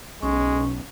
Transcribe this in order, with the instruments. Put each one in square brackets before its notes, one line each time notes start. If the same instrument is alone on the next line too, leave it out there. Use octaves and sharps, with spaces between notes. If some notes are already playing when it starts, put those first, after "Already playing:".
[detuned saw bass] B1 [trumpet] G#3 [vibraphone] C#4